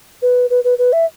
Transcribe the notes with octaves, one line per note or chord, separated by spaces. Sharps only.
B4
B4
B4
B4
E5